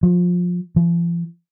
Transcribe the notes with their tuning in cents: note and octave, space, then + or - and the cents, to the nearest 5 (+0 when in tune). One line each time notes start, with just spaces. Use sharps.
F3 +25
F3 -45